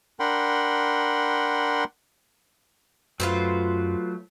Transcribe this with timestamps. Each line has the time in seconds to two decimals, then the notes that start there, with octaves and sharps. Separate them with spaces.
0.20 D4 A#4 F#5 G5 B5 C6
3.20 F#2 F#3 A3 F4 B4 C5